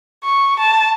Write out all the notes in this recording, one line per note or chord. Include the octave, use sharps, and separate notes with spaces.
C#6
A5